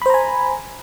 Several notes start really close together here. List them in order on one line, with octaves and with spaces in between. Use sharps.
B5 C5 A#5 G#5